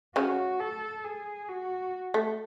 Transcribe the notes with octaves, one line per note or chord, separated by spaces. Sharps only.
C#3 C#4 F#4
A4
G#4
F#4
A3